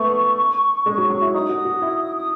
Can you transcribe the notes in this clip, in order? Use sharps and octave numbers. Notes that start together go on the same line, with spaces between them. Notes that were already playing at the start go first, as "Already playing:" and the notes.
Already playing: A3 B3 C#6
G#3
F#3
F#3
E4
D#4 D#6
F#4
F#4
E4
D#6